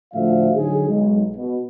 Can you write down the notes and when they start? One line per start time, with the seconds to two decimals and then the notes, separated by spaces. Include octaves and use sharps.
0.14 A2 D3 F3 F#4 E5 F5
0.55 D3 F#3 D#4 G#4
0.89 B1 G#3
1.37 B2